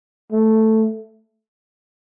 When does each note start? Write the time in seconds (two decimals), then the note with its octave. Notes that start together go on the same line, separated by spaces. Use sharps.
0.32 A3